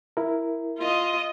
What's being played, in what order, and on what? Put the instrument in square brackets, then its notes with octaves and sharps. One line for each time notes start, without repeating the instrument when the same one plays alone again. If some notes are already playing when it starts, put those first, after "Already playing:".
[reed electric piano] E4 A#4
[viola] F4 D#5